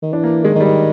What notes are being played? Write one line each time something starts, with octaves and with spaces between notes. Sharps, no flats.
D#3
E3 D4
A#3
D#3 G#3
D#3
G3
D#3